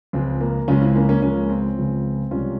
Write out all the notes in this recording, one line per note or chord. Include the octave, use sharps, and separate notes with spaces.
C#2 C#3 F3 G#3 C4
A#3
C#2 C#3 F3 G#3 C#4 F4
C4 E4
A#3 C#4
A#3 C#4
C#2 C#3 F3 G#3 A#3 C#4
C4
C#2 C#3 F3 G#3
C2 C3 F3 G#3 C#4 F4